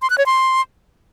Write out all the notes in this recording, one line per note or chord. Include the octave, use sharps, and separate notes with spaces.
C6
F#6
C#5
C6